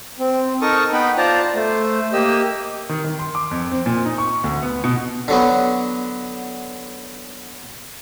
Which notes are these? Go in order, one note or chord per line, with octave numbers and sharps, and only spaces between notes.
C4
D#4 A4 A#4 A5 C#6 D#6
B3 D#4 B4 G5 B5
F4 C5 D5 A5 A#5
A3 C5
A#3 G4 D#5 E6
D#3
D#3
C6
D6
F2
C4
A#2
D#4
C#6
D2
B3
B2
D3 F#3 B3